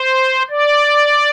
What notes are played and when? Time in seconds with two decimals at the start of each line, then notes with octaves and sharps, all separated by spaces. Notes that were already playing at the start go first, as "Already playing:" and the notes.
Already playing: C5
0.50 D5